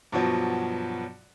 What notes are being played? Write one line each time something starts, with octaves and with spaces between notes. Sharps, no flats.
G2 B2 F3 F#3